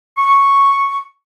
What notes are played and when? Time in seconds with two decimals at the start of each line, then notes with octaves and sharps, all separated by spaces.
0.17 C#6